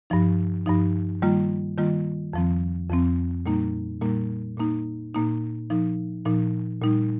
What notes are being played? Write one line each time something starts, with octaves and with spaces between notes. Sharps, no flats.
G2 F3 D#4
G2 F3 D#4
D#3 G3 A#3 F4
D#3 G3 A#3 F4
F2 F3 C4
F2 F3 C4
A#2 G3 A#3 D#4
A#2 G3 A#3 D#4
A#2 A#3 D#4
A#2 A#3 D#4
A#2 F3 D#4
A#2 F3 D#4
A#2 G3 D#4